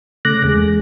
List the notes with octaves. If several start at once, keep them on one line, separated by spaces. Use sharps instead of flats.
C#3 A3 D6 F#6 A#6
E2 G#3